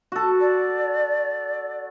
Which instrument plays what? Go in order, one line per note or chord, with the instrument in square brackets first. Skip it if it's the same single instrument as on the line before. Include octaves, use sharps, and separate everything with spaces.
[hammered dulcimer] F#4 A4
[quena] D5